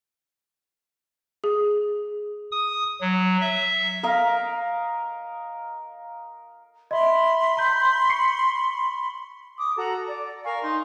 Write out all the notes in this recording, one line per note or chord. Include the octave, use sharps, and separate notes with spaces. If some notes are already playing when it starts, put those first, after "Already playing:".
G#4
D#6
F#3
E5
A#4 D#5 F5
D#5 E5 B5 C6
A#5 G6
C#6 C7 C#7
D6 D#6
F#4 A4 A#5
D5
A#4 F5 G#5 C#6
D#4 C6